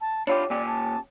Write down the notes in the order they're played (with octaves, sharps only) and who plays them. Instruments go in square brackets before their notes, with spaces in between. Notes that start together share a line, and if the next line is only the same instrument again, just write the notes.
[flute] A5
[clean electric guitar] D4 F4 G4 [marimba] C#5 [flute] B5
[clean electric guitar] A#2 C#4 G4 [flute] D5
[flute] A5